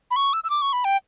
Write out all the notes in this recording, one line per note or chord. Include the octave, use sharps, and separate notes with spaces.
B5
C#6
E6
E6
D6
C#6
B5
G5